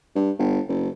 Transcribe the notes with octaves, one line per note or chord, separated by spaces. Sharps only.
G2
G1
F#1